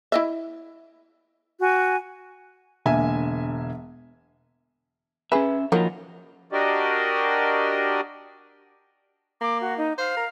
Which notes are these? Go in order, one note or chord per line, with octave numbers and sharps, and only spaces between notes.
E4 D#5 E5
F#4 G#5
E1 D3 A#3 E5 G#5
C#4 G#4 B4 E5
D#3 F3 F#3 A#3 F4 A#4
D4 F#4 G4 A#4 D5 D#5
A#3 D6
F#4
D#4
C5 F5
A#4